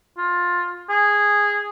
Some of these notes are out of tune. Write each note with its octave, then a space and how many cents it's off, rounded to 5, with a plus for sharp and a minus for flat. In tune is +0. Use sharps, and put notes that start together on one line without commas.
F4 +15
G#4 -10